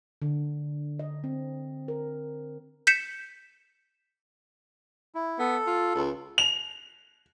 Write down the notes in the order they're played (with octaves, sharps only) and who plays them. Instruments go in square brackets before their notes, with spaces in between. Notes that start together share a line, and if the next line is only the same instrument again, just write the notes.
[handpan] D3
D#5
C4
A#4
[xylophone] G6 B6 C#7 E7
[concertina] E4
[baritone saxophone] B3 [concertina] A4
[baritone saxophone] F4
C#2
[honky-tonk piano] F7